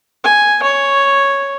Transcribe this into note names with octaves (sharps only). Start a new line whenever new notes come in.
G#5
C#5